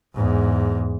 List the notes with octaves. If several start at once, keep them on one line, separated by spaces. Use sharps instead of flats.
E2 G#2